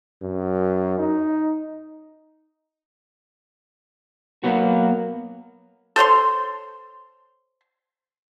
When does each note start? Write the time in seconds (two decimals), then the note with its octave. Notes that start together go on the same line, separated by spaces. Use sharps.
0.22 F#2
0.99 D#4
4.44 F#3 A#3 B3 F#4
5.96 A4 C5 C#5 C6